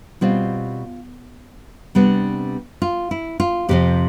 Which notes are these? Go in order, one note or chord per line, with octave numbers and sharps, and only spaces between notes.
B2 G3 C4 F4
C3 G3 B3 D4
F4
E4
F4
F2 C3 F3 G4